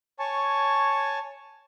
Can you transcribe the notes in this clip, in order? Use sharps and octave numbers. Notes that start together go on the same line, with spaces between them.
C#5 G#5 A5 C#6